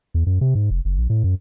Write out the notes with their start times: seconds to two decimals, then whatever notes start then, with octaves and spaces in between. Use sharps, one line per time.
0.14 E2
0.26 F#2
0.41 C3
0.55 G#2
0.71 F1
0.85 F#1
0.98 A#1
1.10 A2
1.24 F#2